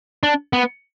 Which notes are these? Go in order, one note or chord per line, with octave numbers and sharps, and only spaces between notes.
D4
B3